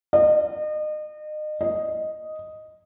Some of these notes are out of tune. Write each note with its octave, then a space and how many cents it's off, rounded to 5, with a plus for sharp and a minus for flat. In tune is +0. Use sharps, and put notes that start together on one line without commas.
D#5 -35
D#5 +0